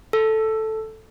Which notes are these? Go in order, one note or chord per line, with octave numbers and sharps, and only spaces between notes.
A4